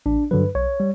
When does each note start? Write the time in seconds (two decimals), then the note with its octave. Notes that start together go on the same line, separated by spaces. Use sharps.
0.06 A1 D4
0.31 G2 D3 F#3 B4
0.55 B1 C#5
0.80 G3